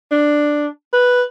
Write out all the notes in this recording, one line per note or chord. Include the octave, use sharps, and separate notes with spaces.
D4
B4